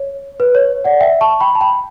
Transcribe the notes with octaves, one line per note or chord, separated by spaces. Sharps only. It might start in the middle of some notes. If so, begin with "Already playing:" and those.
Already playing: C#5
B4
C#5
D5 F#5
E5 G5
A5 C#6
G5 B5
A5
G5 B5